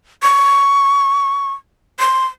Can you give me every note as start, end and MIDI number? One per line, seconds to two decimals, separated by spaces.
0.23 1.53 85
2.00 2.25 84